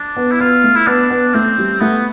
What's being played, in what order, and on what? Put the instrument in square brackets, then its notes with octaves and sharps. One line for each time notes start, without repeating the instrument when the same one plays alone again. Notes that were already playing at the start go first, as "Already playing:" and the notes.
Already playing: [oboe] D4
[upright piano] B3
[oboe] E4
[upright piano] B3 [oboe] F4
[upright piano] A3
[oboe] E4
[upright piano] B3 [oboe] D4
[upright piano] B3
[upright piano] A3 [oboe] C4
[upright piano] G3
[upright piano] A3 [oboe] B3